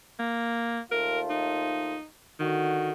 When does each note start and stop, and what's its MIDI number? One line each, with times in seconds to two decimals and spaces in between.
0.19 0.80 58
0.91 1.95 39
0.91 1.95 57
0.91 1.95 65
0.91 1.20 70
1.30 2.05 63
2.40 2.93 50
2.40 2.92 51
2.40 2.93 66